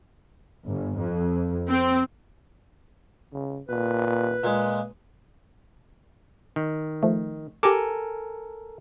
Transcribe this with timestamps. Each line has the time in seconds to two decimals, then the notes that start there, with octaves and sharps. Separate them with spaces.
0.67 G1
1.00 F2
1.69 C4
3.33 C#3
3.69 A#2 B4
4.44 A#2 G#3
6.56 D#3
7.03 F3 A3
7.63 G4 A4 A#4 G#5 A#5 D6